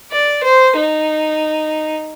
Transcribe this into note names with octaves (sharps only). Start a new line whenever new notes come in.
D5
C5
D#4